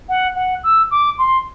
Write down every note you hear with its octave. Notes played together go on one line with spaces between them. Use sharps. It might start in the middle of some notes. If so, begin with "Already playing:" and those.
F#5
F#5
E6
D6
C6